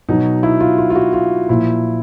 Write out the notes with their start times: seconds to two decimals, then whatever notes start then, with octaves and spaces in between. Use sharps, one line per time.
0.09 B2 F#3 D#4
0.43 E4
0.60 F4
0.78 F4
0.90 F4
0.95 F#4
1.13 F4
1.49 A#2 F3 E4